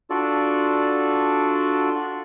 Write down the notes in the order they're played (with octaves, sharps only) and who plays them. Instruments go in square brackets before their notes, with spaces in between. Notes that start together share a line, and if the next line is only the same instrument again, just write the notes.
[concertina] D4 F4 F#4 A4 D5